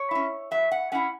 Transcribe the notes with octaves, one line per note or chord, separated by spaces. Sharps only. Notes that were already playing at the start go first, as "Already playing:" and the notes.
Already playing: C#5
C#4 E4
F#3 E5
F#5
C#4 E4 F#5